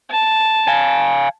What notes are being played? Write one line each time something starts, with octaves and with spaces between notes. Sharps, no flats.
A5
F5 G#5